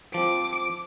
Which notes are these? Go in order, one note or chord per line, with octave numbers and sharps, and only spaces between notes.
F3 C4 D6